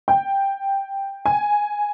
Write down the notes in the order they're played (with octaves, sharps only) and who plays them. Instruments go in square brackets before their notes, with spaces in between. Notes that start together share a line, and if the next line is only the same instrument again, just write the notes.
[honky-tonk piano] G5
G#5